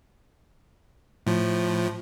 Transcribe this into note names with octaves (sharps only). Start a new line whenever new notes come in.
A2 F3